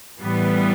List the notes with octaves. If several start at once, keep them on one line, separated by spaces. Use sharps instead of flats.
A2 E3 G3 B3